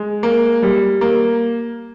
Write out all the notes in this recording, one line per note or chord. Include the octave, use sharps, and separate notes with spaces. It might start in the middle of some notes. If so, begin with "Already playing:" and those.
Already playing: G#3
A#3
G3
A#3